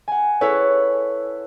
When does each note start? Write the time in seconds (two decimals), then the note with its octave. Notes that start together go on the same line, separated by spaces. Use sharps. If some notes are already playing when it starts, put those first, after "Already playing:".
0.08 F#5 G#5
0.41 E4 A4 B4 C#5